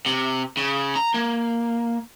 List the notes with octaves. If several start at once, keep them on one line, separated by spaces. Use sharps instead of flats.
C3
C#3
A#5
A#3